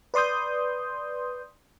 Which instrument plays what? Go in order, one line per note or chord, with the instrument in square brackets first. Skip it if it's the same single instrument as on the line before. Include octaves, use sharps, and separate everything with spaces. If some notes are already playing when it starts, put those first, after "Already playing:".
[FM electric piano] B4 D5 C6 D#6 G6